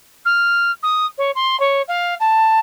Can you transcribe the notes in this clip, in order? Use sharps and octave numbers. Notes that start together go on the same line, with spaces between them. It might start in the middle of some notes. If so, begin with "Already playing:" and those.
F6
D#6
C#5
C6
C#5
F5
A5